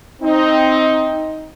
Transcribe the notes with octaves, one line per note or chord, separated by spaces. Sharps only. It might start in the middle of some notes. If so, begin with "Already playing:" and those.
C4 D#4